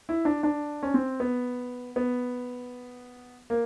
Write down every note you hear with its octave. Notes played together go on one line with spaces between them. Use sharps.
E4
D4
D4
C#4
C4
B3
B3
A#3